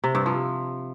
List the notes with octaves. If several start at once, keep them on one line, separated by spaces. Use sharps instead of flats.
C3
G2
F3